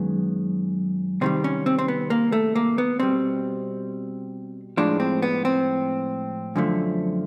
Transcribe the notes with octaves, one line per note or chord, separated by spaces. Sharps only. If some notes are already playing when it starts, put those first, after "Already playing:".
Already playing: F#2 D#3 G#3 B3
C3 D#3 G3 C4
C#4
C4
C4
B3
A#3
A3
A#3
B3
B2 G3 C4
A2 F3 G#3 D4
C4
B3
C4
F#2 D3 F3 A3